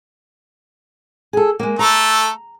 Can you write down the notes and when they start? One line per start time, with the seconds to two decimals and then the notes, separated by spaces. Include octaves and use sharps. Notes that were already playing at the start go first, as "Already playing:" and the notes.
1.33 G#4 A4
1.59 G#3 A#3
1.79 A3 A4 A#5